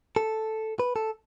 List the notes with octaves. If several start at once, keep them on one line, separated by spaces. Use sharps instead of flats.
A4
B4
A4